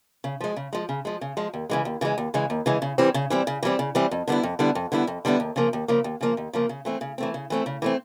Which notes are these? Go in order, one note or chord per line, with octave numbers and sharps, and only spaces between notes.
C#3
F3 G#3
C#3
F3 G#3
C#3
F3 G#3
C#3
F3 G#3
D#2
C#3 E3 G#3
D#2
C#3 E3 G#3
D#2
C#3 E3 G#3
D#2
C#3 E3 G#3
C#3
E3 G3 C4
C#3
E3 G3 C4
C#3
E3 G3 C4
C#3
E3 G3 C4
F2
D3 G3 B3 E4
F2
D3 G3 B3 E4
F2
D3 G3 B3 E4
F2
D3 G3 B3 E4
D#2
C#3 F3 A#3
D#2
C#3 F3 A#3
D#2
C#3 F3 A#3
D#2
C#3 F3 A#3
C#3
E3 A3 C4
C#3
E3 A3 C4
C#3
E3 A3 C4
C#3
E3 A3 C4